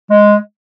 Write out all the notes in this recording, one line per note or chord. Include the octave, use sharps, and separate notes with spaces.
G#3